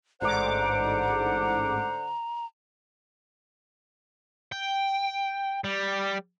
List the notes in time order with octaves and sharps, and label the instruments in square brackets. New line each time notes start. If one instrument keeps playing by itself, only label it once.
[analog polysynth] A1 G#2 D6 [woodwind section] D3 C5 F#5 [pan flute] A#5
[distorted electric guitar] G5
G3